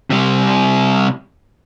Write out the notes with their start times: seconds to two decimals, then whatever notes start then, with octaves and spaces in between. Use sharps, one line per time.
0.10 C3 G3